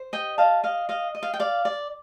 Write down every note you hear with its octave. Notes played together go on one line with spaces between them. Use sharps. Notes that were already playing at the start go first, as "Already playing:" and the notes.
Already playing: C5
G4 D#5 G5
D#5 F5 A5
D#5 F5
D#5 F5
D#5
F5
G5
D5 F5
D5